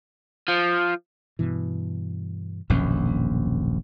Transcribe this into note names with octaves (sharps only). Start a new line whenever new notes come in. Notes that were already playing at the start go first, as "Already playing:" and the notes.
F3
G2 B2 E3
D#1 A#1 F#2 B2 C4 C#4